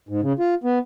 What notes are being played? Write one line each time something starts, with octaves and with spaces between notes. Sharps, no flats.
G#2
C#3
F4
B3